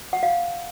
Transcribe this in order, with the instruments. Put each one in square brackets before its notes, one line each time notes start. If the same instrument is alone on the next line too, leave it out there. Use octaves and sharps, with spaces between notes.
[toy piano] F#5
F5